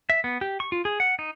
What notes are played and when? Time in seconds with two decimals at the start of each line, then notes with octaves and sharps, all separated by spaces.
0.10 E5
0.24 B3
0.41 G4
0.60 C#6
0.72 F4
0.85 G#4
1.00 F#5
1.19 D#4